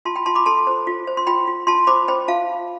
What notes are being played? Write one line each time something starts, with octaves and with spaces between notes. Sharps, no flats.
F4 A5 C6
G5 B5
F4 A5 C6
B5 D6
A4 A5 C6
C5
F4
C5
C6
F4 G5 B5
F4
F4 A5 C6
C5 B5 D6
C5 G5 B5
F4 F5 A5